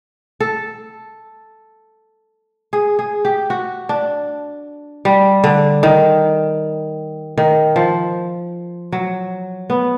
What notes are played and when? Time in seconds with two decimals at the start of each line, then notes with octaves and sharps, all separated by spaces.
0.40 A4
2.73 G#4
2.99 G#4
3.25 G4
3.50 F#4
3.89 D4
5.05 G3
5.44 D3
5.83 D#3
7.37 D#3
7.76 F3
8.92 F#3
9.70 B3